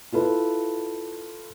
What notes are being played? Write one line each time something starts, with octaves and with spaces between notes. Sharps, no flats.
E4 F4 A4 B4